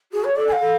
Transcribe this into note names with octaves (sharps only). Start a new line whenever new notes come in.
F#4 G#4
C#5
A4 D5
G#5
F5
A4